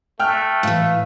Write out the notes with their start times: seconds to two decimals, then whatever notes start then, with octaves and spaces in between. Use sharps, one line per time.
0.19 A3 G5 F6 F#6
0.63 A2 E3 F5